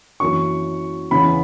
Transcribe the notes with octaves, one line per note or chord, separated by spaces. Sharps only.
F#2 E3 A#3 C#6
E2 C#3 E3 B3 B5